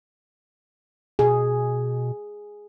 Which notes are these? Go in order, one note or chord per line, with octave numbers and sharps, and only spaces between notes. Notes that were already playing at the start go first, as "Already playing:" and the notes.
B2 G#4